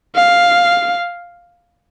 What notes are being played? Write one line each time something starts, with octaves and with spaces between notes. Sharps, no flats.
F5